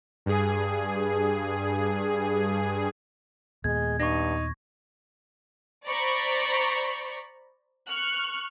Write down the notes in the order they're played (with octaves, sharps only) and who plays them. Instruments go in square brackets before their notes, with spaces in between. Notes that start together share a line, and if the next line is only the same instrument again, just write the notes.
[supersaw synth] G2 G#4
[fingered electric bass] D#2 A#2 B3 [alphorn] G#3 [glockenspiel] G#6
[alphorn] G2 [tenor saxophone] D#4 [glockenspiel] C#6 A#6
[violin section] C5 D5 A#5 B5 C#6
C#6 F6 F#6